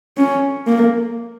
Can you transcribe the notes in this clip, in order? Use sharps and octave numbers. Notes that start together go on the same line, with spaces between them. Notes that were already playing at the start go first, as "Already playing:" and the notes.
C#4
A#3